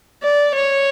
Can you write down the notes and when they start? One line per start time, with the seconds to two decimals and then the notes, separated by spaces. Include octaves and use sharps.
0.23 D5
0.55 C#5